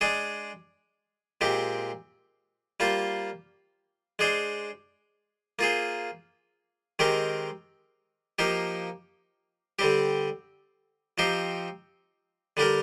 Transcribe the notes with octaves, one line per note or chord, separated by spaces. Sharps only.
G#3 D4 G#4
A#2 G#3 C4 G4
G3 A#3 F4 C5
G#3 D4 G#4 C5
A#3 F4 G#4 C5
D#3 G#3 C4 G4 A#4
F3 A#3 D#4 G4 C5
D3 G3 C4 G4
F3 C4 D#4 G4 C5
D3 G3 D4 G4 A#4